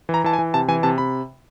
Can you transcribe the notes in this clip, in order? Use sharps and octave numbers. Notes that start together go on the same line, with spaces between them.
E3
A#5
E3 A5
G#5
E3
C3 A5
E3 G#5
C3 A5
C3 B5